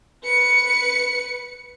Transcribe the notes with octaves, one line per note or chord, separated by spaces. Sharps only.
B4 C#7